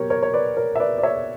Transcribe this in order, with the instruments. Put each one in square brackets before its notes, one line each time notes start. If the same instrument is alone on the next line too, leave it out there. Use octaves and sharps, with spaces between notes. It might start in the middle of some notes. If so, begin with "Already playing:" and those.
Already playing: [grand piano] B2 F#3 G4 A#4 C#5
A#4 C#5
C#5
B4 D5
A#4 C#5
E5
B4 D5
D5
C#5 E5